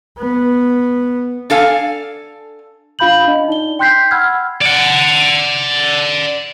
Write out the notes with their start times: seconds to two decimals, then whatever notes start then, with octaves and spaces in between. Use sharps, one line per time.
0.18 B3
1.50 D4 A4 F5 G#5
2.99 D4 F4 F5 B5 G6 F#7
3.27 D4 D#5
3.48 D#4 D5 G7
3.79 G5 C6 F#6 G6 B6 C7
4.11 F#5 B5 E6 F6 G#6
4.62 D5 F#5